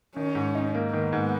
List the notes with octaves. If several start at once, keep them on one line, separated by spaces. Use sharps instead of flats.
D#3 C#4
G#2
D#4
A#3
D#3 B3
G#2